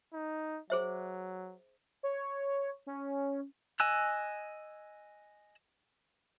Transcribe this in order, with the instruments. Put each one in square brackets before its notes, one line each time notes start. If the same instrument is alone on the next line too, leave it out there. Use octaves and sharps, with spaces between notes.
[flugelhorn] D#4
[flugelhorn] F#3 [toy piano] G#4 C5 E5
[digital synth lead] C#5
C#4
[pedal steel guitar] D#5 G#5 E6 F#6